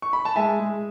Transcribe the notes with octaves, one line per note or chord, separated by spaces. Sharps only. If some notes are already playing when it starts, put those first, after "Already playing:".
C#6
B5
A5
G#3 E5 G#5
G#3